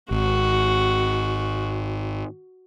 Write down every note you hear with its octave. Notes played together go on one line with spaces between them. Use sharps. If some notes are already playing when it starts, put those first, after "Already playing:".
G#1 F#4